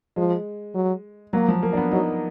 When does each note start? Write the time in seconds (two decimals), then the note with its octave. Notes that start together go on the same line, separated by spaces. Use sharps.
0.16 F3 G#3
0.75 F#3
1.33 F#3 A#3
1.48 F3
1.63 A#3
1.73 D4
1.77 B3
1.91 F#3 D#4